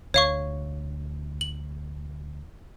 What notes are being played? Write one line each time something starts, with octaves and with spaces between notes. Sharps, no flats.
D2 C#5 F5 C#6
F#7